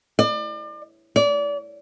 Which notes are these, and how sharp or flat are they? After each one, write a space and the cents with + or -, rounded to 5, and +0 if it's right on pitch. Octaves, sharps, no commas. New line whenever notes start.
D5 +35
D5 -30